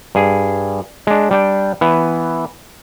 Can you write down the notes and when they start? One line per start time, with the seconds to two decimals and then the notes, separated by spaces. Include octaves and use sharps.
0.15 G2 G#4
1.07 G#3 D4
1.31 G3 D4 G5
1.81 E3 B3